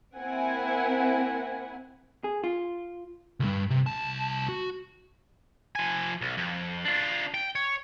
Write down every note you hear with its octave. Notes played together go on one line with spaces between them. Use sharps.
A#3 C4 E4 F#5 G#5
G#4
F4
C#2 G2
C3
C2 A5
F#4
F3 G#5
B1
F2
D4 F4
G5
C#5